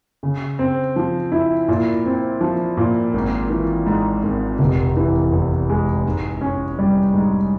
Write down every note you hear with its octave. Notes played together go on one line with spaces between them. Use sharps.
C#3
C4
F3
E4
A#2
C4
F3
A#2
G#1
E3
G#2
G#1
F1
E3
E2
G#3
G#2
C#4
G3
G#2